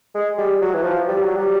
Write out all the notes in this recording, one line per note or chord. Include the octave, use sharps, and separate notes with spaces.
G#3
G3
F#3
E3
F3
G3
F#3
G3